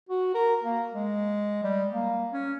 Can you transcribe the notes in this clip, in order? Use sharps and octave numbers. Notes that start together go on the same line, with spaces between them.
F#4
A#4
A#3
G#3
G3
A#3
C#4